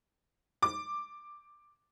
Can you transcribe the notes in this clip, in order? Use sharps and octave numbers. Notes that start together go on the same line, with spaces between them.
D6